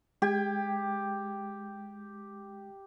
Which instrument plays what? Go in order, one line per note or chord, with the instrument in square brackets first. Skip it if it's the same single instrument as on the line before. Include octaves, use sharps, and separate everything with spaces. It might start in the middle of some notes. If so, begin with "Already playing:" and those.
[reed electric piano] G#3 G5 G#6 [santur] G4